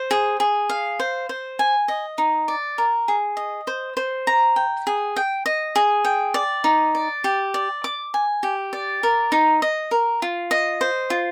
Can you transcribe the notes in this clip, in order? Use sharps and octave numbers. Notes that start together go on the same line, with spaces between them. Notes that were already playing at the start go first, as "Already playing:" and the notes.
Already playing: C5
G#4
G#4
F5
C5
C5
G#5
D#5
D#4
D5
A#4
G#4
D#5
C5
C5
A#5
G5
G#4
G5
D#5
G#4
G5
D5
D#4
D5
G4
D5
D6
G#5
G4
D5
A#4
D#4
D#5
A#4
F4
D#5
C5
F4